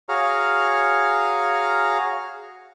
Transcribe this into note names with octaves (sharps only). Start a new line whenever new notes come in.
F#4 G#4 C#5 F5 A#5 F6